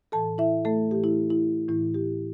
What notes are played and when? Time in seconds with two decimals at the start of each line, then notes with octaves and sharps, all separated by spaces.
0.12 A2 E3 A4 A5
0.38 E4 E5
0.65 A3 A4
0.91 A2 E3 G4
1.04 E4
1.30 E4
1.68 A2 E3 E4
1.94 G4